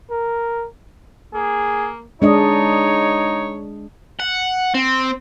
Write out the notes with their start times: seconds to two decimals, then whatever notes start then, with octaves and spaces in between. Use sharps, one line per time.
0.11 A#4
1.34 A#3 G#4
2.22 G#3 D4 D#4 C#5 D#5
4.20 F#5
4.75 C4